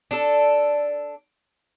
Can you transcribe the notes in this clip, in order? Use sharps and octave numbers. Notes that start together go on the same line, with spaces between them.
D4 A4